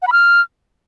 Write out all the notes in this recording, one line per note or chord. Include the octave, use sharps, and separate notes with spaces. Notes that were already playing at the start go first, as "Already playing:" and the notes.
F#5
B5
F6